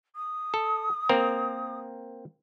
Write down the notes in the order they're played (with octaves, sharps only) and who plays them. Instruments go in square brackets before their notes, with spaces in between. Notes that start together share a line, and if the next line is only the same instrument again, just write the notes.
[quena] D#6
[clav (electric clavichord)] A4
A#3 C4 A#4